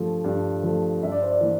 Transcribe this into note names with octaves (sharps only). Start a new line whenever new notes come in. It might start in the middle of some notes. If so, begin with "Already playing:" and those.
Already playing: G2 F3 A3
G2
F3 A3
G2 E5
D5
C5
D5
E3 A#3